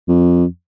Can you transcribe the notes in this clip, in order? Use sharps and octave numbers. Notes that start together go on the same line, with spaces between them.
F2